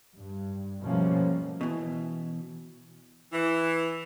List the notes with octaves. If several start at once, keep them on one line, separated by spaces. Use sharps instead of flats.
G2
B2 F3 G3 A3 A#3 C#4
B2 E3
E3